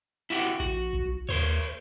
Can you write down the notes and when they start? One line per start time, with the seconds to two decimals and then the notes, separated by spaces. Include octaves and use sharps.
0.30 E4 F#4 G4
0.60 A#1 F#4
0.93 B1
1.29 D#2 A#4 C5 C#5